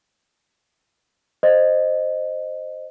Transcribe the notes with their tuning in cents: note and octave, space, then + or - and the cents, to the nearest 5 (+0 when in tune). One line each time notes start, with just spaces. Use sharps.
C5 +0 D#5 -15